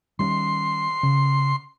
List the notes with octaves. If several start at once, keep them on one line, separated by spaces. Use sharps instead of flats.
D#3 G3 C#4 C6
C#3